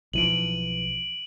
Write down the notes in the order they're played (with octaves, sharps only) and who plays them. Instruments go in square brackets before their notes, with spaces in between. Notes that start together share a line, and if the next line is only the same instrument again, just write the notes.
[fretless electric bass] B1 E3 F3 [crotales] D7 D#7 F#7